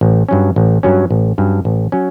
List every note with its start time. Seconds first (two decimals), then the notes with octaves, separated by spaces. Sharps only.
0.01 A1
0.28 G2 F#3 C#4
0.56 A1
0.83 G2 F#3 C#4
1.11 A1
1.38 G2 F#3 C#4
1.65 A1
1.92 F#3 C#4